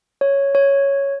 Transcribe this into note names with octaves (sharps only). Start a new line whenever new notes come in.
C#5
C#5